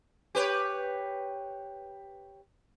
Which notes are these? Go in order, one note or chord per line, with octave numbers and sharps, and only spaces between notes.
G4 B4 C#5